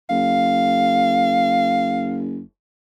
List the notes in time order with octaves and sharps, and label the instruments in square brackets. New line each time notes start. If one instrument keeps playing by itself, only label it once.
[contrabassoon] F#1 [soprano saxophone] F5